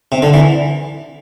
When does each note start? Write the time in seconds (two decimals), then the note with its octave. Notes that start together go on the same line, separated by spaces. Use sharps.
0.12 C3
0.22 D3
0.33 E3